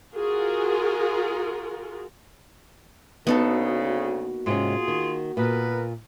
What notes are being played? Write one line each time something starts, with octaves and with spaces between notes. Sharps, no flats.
F4 F#4 G#4 A#4
D2 C#3 A#3 B3 D#4 F#4 A4
G#2 C3 C#4 F4 G#4
D#3
A#2 B3 A#4 B4